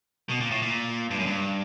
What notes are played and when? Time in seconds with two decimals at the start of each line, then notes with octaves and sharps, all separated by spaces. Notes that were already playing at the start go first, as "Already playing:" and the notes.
0.29 B2
0.40 A#2
0.51 A2
0.62 A#2
1.11 G2
1.19 F#2
1.26 G2